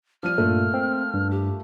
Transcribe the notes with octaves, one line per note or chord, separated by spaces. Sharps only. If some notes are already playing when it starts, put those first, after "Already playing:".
F3 G3 F6 D#7
G2 A#2 A3 A#3 F4
C4
G2
G4